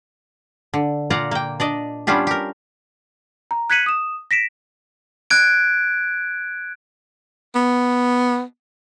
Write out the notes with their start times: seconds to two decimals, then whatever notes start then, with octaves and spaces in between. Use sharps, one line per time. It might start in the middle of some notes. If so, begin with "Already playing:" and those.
0.74 D3
1.10 A#2 F4 D5 F#5 A#5
1.31 A#3 G5
1.60 D4 D5 D#5
2.07 G3 B3 C#4 D4 F4 G4
2.27 G4 A#4
3.51 A#5
3.70 F#6 G#6 B6 C#7 D#7 F#7
3.86 D#6 E7
4.31 A#6 B6 D7 E7
5.30 F#6 G#6 D7
7.55 B3